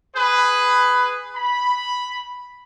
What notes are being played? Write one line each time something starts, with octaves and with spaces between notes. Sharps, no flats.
G#4 B4
B5